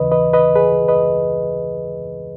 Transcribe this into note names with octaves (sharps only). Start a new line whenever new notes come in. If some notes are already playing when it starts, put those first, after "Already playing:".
Already playing: D#2 C#3 E3 B4 D#5
B4 D#5
B4 D#5
G#4 B4
B4 D#5